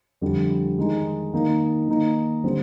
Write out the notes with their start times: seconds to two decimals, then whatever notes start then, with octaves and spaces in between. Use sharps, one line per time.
0.21 F2 D3 G3
0.78 D#3 G#3 D#4
1.33 D#3 A#3 D#4
1.88 D#3 A#3 D#4
2.44 D3 G3 C4